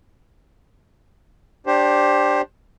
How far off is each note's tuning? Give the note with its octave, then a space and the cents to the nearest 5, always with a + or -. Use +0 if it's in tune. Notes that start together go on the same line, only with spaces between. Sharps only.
D4 +0 G4 +0 C5 +15